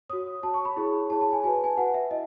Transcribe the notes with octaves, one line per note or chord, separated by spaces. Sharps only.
F#4 C#5 D#6
F#4 C#5 A5
C#6
B5
E4 G#4 C#5
E4 G#4 C#5 A5
A5
G#5
F#4 B4 G#5
A5
G#5
F#4 B4 F#5
E5
E4 D#5